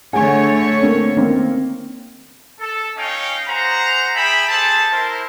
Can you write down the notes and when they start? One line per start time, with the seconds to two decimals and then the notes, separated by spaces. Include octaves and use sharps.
0.13 D3 A3 G#4 C#5 F#5 G#5
0.82 A#3 C4 C#4
1.16 D#3 A#3 C4
2.60 A4
2.97 C#4 D#4 C#5 D#5 F5 G5
3.48 G#4 C5 F#5 A#5
4.15 G#4 E5 G5 A5 B5
4.48 G#4 A4 C5 A5
4.91 E4 A#4 C5